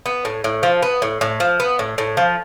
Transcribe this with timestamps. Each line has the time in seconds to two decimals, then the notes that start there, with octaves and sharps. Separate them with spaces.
0.06 B3
0.25 A2
0.44 A2
0.63 F3
0.83 B3
1.02 A2
1.21 A2
1.40 F3
1.60 B3
1.79 A2
1.98 A2
2.17 F3